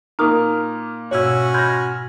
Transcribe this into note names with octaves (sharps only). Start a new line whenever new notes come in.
A#2 D#4 A#4 A#5 D6 D#6 F6
G#2 B2 C#4 E4 F#4 C#5 E6 G#6
B5 C6 F6 G6 G#6 A#6